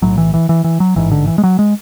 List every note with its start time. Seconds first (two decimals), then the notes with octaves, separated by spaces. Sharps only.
0.02 B1 A2 F#3
0.18 E3
0.34 E3
0.49 E3
0.64 E3
0.80 F#3
0.96 A1 G#2 E3
1.11 D3
1.27 E3
1.38 G#3
1.44 F#3
1.59 G#3